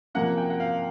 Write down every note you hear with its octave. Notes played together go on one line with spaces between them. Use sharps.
C3 F3 A#3 C#4 F#5
G5
F#5
F5